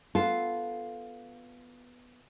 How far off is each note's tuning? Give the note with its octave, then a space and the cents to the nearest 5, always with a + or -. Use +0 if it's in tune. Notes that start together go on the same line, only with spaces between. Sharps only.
B3 +0 F4 +0 A4 +0